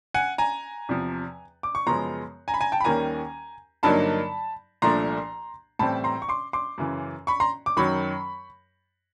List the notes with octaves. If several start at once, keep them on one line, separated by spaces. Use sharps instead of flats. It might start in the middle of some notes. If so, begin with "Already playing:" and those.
F#5 G#5
G#5 A#5
E2 C3 F3
D6
C#6
F#2 C#3 F3 G#3 B3 A#5 C6
G#5 A#5
B5
G#5 A#5
G5 A5
B5
D#2 D#3 G3 A#3 C#4 G#5 A#5
G2 D3 F#3 A#3 D#4 A5 B5
C2 A#2 F3 A3 D4 A#5 C6
A2 E3 G3 C4 A5 B5
A#5 C6
C#6
C6 D6
C6 D6
F#2 C#3 E3
B5 C#6
A#5 C6
D6
F#2 D#3 F#3 B5 C#6